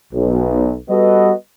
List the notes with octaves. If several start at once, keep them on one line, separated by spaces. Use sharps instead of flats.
B1
G3 B3 F#4 A4 B4 D#5